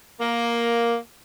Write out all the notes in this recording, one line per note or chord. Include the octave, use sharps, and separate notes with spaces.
A#3